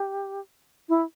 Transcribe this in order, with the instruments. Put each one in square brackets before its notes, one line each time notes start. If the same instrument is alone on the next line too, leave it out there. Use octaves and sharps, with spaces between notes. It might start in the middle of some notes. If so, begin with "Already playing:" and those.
Already playing: [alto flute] G4
E4